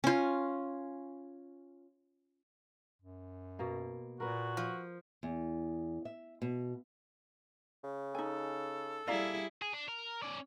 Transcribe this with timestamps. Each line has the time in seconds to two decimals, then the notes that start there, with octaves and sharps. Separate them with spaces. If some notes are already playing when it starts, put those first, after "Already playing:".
0.04 C#4 F4
3.02 F#2
3.59 B2 A#3
4.20 A#2 F#4 A#4 B4
4.57 F3
5.23 E2
6.05 E5
6.42 B2
7.84 C#3
8.15 D#4 A4 G#5
9.08 G3 E4 G#4 D5 F5 A#5
9.62 G#4
9.73 D4
9.88 A#4
10.22 C#4 D5